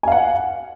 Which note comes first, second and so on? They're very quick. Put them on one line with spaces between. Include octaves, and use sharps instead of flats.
G#5 F5 F#5